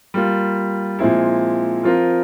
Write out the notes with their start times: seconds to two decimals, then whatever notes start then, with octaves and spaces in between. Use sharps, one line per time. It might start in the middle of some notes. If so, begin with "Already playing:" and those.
0.14 G3 A#3 F4
0.99 A#2 F3 G#3 C4 E4
1.83 F3 C4 F4 A#4